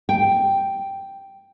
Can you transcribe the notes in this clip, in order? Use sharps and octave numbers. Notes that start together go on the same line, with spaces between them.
G5